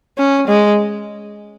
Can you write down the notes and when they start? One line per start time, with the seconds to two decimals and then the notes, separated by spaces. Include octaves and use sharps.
0.18 C#4
0.48 G#3